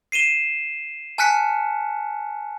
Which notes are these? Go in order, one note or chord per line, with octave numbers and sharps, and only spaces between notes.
C7 D#7 E7 G7
G#5 A5 F6 F#6 B6 C#7